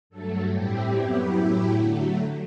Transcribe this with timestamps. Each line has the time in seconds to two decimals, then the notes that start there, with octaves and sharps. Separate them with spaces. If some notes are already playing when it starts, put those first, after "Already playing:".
0.10 G2 F#3 A3 A4
0.51 A2 G3 C4 E4 G4
0.93 F#2 F#3 B3 E4
1.35 A2 F#3 A3 E4
1.76 D3 F#3 A3